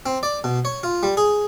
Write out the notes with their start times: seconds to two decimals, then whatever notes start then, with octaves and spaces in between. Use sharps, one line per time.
0.06 C4
0.23 D5
0.44 B2
0.65 C#5
0.83 F4
1.03 G3
1.17 G#4